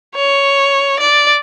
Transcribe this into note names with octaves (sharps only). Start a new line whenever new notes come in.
C#5
D5